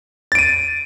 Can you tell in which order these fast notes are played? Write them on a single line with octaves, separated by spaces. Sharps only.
A6 D7 D#7